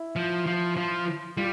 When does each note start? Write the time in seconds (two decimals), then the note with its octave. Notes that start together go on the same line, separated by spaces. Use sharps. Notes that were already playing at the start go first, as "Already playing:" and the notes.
Already playing: E4
0.16 F3
0.46 F3
0.76 F3
1.37 G3 F4